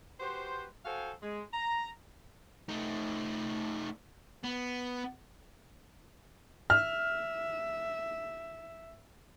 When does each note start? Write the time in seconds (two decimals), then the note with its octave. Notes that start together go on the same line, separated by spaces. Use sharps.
0.20 F#4 G4 B4 C5
0.86 F#4 A4 C5 F5 G5 G#5
1.22 G#3
1.54 A#5
2.69 A3 D#4
4.43 B3
6.70 E5 F6